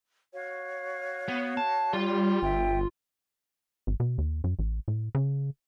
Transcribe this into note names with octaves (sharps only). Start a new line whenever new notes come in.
F#4 C#5 F5
B3
A5
G3 F4
G1 E5 G5
G#1
B2
D#2
F#2
A1
A2
C#3